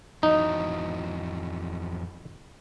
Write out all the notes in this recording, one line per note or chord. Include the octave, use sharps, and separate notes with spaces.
F2 E3 F#3 D#4